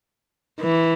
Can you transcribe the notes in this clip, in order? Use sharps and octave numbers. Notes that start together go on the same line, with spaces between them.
E3